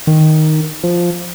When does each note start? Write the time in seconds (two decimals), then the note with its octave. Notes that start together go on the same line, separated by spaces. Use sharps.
0.07 D#3
0.84 F3